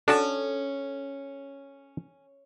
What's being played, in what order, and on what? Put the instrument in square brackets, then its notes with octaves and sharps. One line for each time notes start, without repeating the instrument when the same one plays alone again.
[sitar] C#4 [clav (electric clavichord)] D4 F#4 A5 [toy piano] A4